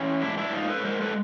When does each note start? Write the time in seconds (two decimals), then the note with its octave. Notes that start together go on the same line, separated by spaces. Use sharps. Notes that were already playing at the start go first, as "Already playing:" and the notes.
Already playing: E3 C#4
0.22 G#2 D4 E4
0.38 D4 E4
0.53 G#2 D#4 F4
0.69 A4 B4
0.85 G#3 A#4 C5
1.01 A4 B4